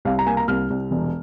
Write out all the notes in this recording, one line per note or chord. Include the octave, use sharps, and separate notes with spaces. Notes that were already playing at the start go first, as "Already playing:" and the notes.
C2 F5
A#5
A#3 G#5
A#5
C2 F6
C2
E1